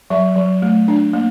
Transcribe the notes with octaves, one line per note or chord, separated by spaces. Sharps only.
F#3 E5
F#3
A3
D4
A#3